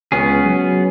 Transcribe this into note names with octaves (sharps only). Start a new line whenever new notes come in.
C#2 B3 C#4 G#4
F#3